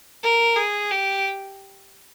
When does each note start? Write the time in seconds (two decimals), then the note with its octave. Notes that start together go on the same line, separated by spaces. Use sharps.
0.23 A#4
0.56 G#4
0.91 G4